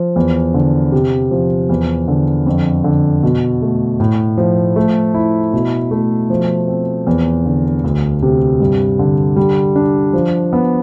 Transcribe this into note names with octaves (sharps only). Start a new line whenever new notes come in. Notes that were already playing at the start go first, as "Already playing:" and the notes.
Already playing: F3
E2
D3
C3
F3
E2
D3
F2
D3
B2
A3
A2
F3
A3
E4
B2
A3
F3
C4
E2
D3
D2
C3
G2
D3
G3
D4
F3
B3